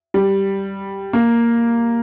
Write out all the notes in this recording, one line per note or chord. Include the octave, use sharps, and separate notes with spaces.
G3
A#3